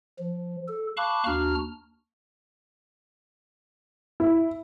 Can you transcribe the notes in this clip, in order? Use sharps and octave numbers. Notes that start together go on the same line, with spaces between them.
F3
A4
F5 A5 B5 C#6 D6 F#6
D#2 D4 F#4 A#5 F6
E4